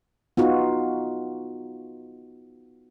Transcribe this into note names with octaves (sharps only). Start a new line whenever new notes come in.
B3 D#4 F4 F#4